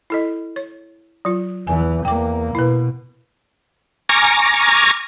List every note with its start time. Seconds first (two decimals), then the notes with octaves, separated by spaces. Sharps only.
0.10 E4 A4 D#5
0.56 C#5
1.25 F#3 F4
1.67 E2 E3 G#5
2.05 E2 A#3 G5 D6
2.55 B2 E4 B4
4.09 G#5 A#5 C#6 D6 F6 A#6